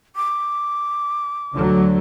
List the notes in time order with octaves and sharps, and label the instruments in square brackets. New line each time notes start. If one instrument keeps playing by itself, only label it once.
[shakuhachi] D6
[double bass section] D2 D3 F#3